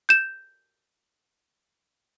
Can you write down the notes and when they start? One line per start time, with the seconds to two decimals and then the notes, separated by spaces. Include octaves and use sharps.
0.09 G6 E7